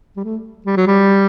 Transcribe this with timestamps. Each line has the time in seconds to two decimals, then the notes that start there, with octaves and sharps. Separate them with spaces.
0.17 G3
0.24 A3
0.66 G3
0.77 F#3
0.87 G3